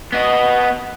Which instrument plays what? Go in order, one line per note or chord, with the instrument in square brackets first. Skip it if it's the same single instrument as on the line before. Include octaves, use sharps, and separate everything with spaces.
[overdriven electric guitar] B3 D#5